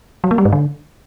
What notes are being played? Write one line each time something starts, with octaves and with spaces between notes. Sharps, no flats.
F#3
A#3
G3
G#2
D3